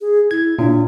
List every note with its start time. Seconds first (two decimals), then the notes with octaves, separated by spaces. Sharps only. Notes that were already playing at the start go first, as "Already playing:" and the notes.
0.01 G#4
0.31 E4 G#6
0.59 A#2 D4